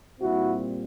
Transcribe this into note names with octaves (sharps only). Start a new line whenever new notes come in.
A#2 G3 C4 E4 F#4